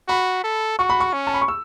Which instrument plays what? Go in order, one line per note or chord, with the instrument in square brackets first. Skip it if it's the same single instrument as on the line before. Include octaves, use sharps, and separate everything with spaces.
[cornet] F#4 [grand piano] B5
[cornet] A4
[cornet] F#4 [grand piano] C#6
[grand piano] B5
C#6
[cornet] C#4
[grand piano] A5
B5
C#6
E6